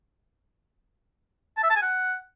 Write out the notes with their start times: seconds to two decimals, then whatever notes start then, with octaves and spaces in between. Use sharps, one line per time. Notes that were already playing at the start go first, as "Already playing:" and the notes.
1.57 A5
1.63 E5
1.70 A5
1.76 G#5
1.82 F#5